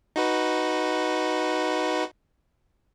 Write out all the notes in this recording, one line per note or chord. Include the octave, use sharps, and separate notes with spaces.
D#4 F#4 B4